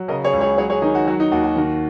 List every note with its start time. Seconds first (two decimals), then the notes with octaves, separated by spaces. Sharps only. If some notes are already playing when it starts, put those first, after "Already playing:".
Already playing: F#3
0.08 C#3 A#4 D#5
0.25 G#4 C#5
0.33 C#2
0.41 G#4 C#5
0.58 F#3 G#4 C#5
0.70 G#4 C#5
0.82 D#3 D#4 G#4
0.95 F#4
1.07 F#3 F#4
1.20 D#4
1.32 D#2 F#4
1.43 F#4
1.56 D#3 F#4